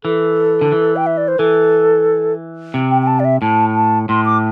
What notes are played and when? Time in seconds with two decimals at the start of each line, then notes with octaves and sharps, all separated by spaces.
0.04 E3 A4
0.61 D3
0.72 E3
0.96 G5
1.06 E5
1.17 D5
1.28 C5
1.39 E3 A4
2.74 C3
2.91 G5
3.02 G5
3.07 A5
3.20 D5
3.25 E5
3.42 A2 A5
3.75 A5
4.09 A2 C6
4.26 D6